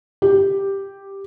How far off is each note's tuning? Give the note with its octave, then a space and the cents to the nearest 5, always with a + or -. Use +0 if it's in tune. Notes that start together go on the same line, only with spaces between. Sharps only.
G4 +0